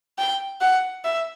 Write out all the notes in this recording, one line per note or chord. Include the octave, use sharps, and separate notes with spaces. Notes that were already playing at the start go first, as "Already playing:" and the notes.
G5
F#5
E5